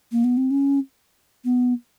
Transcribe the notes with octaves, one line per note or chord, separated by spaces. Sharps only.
A#3
B3
C4
C#4
B3